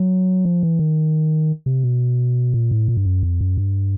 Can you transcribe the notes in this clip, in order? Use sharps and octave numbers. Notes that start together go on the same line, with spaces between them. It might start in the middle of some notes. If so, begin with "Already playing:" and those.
Already playing: F#3
F3
E3
D#3
C3
B2
A#2
A2
A#2
G2
F#2
F2
F#2
G2